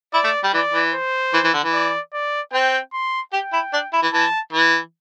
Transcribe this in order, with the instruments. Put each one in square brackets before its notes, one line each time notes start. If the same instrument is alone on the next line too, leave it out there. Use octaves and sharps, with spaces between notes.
[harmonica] E4 [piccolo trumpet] D5
[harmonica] A3
G3
[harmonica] E3 [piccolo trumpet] D5
[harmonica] E3
[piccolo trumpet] C5
[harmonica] E3
E3
D3
E3
[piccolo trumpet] D5
D5
[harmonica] C4 [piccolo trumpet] G5
[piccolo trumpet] C6
[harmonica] G4 [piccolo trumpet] G5
[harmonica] E4
D4
E4
E3
[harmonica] E3 [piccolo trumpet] A5
[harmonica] E3